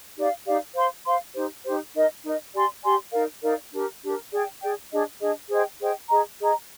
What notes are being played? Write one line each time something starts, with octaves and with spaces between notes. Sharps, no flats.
D#4 G4 D5 F5
D#4 G4 D5 F5
C5 F5 C6
C5 F5 C6
D#4 G4 C5
D#4 G4 C5
D#4 A#4 D#5
D#4 A#4 D#5
G4 D5 G#5 C6
G4 D5 G#5 C6
D#4 A#4 D5 F5
D#4 A#4 D5 F5
D4 G4 A#4
D4 G4 A#4
G#4 D5 G5
G#4 D5 G5
D4 G#4 D#5
D4 G#4 D#5
G#4 C5 D#5 G5
G#4 C5 D#5 G5
G#4 D#5 A#5
G#4 D#5 A#5